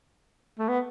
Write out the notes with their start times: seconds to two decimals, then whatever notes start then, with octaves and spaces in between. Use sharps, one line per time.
0.58 A3
0.68 B3